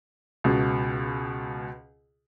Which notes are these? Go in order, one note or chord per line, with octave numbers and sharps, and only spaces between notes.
C#2 B2